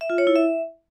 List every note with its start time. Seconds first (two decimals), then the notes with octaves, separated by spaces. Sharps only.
0.01 E5
0.10 F4
0.18 C#5
0.27 E4
0.36 E5